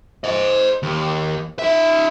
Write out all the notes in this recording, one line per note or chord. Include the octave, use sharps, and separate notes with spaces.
C5 D#5
D#2
D#4 E5